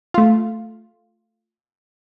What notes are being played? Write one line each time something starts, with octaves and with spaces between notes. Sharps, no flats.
A3 F4